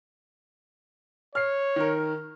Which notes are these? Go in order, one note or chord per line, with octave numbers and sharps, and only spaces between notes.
C#5 F6 C7
D#3 A#4